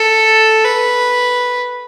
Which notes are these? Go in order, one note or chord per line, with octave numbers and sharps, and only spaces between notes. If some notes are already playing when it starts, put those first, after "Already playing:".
Already playing: A4
B4